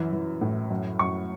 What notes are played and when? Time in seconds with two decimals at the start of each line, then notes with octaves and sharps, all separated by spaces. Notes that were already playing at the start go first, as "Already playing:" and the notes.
Already playing: F#2 E3
0.13 E3
0.41 A2
0.70 F#2
0.99 F#2 C#6